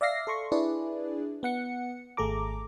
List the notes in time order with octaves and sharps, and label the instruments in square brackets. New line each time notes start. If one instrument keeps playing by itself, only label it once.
[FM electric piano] D5 E5 F5 A#6 C7
A4 C6 C#6
D4 E4 G#4 B4 D5
B3 F#5 C#7
G#1 A3 G#4 A4 A#5 D6